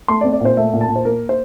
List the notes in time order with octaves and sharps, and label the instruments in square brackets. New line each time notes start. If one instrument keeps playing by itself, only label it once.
[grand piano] A3 C6
D5
C4
D5
A#2 C5
A3 E5
A#2
A5
A#2
C5
A#3 A#4
C5